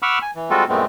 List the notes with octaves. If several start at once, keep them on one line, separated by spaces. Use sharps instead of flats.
F#5 B5 C#6 D6 E6 F6
G#5
E3
G3 G#3 C4 F4 F#4 A4
F#2 A#2 G#3 A3 B3 C4